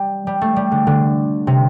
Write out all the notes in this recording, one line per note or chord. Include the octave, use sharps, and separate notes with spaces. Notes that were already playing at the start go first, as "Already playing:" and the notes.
Already playing: G3
G3
A3
G3
D3
D3
C3